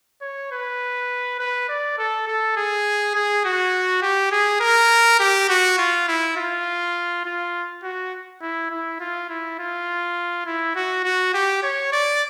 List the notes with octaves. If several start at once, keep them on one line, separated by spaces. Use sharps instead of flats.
C#5
B4
B4
D5
A4
A4
G#4
G#4
F#4
G4
G#4
A#4
G4
F#4
F4
E4
F4
F4
F#4
E4
E4
F4
E4
F4
E4
F#4
F#4
G4
C#5
D5